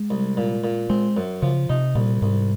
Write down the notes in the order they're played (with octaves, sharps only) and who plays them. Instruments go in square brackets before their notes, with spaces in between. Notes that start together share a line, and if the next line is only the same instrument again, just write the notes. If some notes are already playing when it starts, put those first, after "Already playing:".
Already playing: [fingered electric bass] G#3
[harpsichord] C2
A#2
A#2
[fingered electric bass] G#3 [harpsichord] C4
[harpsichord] F#2
[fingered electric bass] C#3 [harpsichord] F3
[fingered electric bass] C3 [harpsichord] D#4
[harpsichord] C2 [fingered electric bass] A#2
[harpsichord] C2 [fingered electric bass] G#2